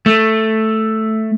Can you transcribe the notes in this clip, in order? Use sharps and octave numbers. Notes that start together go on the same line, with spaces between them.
A3